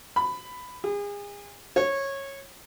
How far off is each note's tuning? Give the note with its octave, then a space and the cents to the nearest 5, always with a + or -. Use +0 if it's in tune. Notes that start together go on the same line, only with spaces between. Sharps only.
B5 +15
G#4 -35
C#5 -15